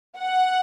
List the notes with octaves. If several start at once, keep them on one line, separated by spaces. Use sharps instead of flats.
F#5